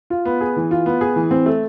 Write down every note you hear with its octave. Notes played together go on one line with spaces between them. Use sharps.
F4
B3
G#4
E3
F4
B3
G#4
E3
C4
A3